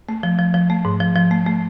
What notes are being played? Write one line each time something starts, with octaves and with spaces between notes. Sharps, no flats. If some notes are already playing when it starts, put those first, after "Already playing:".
A3
F3
F3
F3
A3
G#2
F3
F3
A3
A3